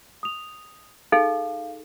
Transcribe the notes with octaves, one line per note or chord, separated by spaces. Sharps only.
D#6 F7
D#4 G#4 A4 F5